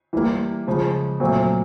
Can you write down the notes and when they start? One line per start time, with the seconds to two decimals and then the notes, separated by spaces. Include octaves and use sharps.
0.13 E3 G3 A#3
0.67 C#3 F3 G#3
1.20 A#2 F#3 A3 C4